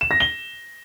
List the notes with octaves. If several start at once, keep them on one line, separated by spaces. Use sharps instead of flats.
E7
A#6
G7